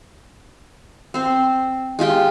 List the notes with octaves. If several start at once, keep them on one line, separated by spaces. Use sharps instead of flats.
C4 C5
G#3 F4 G4 G5